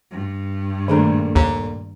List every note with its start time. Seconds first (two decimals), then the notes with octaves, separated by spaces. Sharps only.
0.12 G2
0.88 A#2 D#3 A3 D4 G#4 A#5
1.35 D#2 A#5